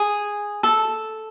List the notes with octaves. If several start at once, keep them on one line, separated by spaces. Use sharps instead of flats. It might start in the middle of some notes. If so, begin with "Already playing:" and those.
Already playing: G#4
A4